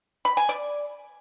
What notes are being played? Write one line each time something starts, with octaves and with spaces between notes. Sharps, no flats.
B5
G#5
D5